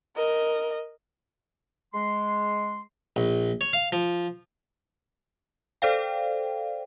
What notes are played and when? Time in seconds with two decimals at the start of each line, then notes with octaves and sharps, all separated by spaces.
0.16 A#4 D#5
1.94 G#3 C6
3.16 A#1
3.61 C#5
3.73 F5
3.92 F3
5.82 A4 C5 D5 F5 G5